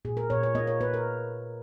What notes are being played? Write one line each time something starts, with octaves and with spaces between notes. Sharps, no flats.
A#2 G#4
A#4
A#2 C#5
C#5
A#3 D#5
C#5
A#3 B4
A#4